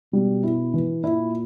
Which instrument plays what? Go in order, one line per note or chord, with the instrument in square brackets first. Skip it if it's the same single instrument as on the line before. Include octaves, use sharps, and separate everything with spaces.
[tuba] B2 [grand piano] G3
[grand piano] E4
E3
[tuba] A#2 [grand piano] E4